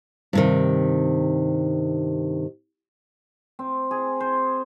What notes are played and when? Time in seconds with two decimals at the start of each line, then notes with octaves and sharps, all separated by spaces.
0.33 G2 C3 D#3
3.59 C4
3.91 G#4
4.20 C5